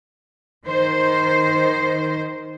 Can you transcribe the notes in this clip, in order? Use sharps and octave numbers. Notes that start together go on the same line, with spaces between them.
D#3 C5